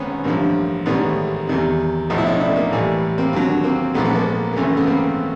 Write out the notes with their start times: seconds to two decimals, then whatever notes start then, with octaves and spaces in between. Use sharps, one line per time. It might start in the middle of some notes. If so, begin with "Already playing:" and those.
Already playing: G#1 G#2 D#3 B3 C#4
0.24 A1 G2 D3 F3 A#3
0.86 A1 G#2 D#3 G3 A3 B3
1.47 E2 C3 D#3 G3
2.10 B1 A2 F3 D#4
2.18 E4
2.26 C#4 D#4
2.40 D4 E4
2.49 A3
2.56 A#3
2.71 A1 A2 E3 G3
3.18 A#3 C4
3.33 D#2 D3 F#3
3.64 A#3 C4
3.95 A#1 G#2 F3 A3 B3
4.05 A3 B3
4.15 A#3
4.53 A#3
4.56 G#1 F#2 C#3 E3 A3
4.67 A#3
4.77 A3 B3
4.87 A#3 C4